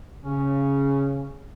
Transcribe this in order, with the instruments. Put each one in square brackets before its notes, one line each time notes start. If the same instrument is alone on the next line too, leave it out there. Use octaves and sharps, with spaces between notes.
[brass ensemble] C#3 [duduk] C#4